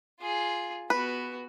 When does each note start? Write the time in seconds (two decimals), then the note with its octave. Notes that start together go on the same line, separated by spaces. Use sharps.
0.20 F4 G#4
0.90 B3 F#4 B4